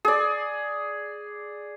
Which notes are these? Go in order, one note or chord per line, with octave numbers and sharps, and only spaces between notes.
G#4 D5